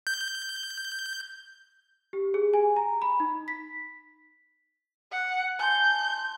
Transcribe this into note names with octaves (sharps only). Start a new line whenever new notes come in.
G6
G4
G#4
G#5
A#5
B5
D#4
B6
F#5
G#5 A5 C6 G6